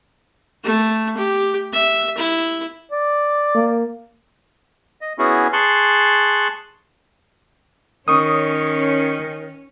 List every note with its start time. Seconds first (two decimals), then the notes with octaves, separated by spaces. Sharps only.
0.64 A3
1.17 G4
1.73 E5
2.18 E4
2.92 D5
3.55 A#3
5.01 D#5
5.19 B3 C#4 E4 F#4 G#4
5.53 G#4 A5 C6 C#6 F#6
8.08 D#3 C#4 C#6 D#6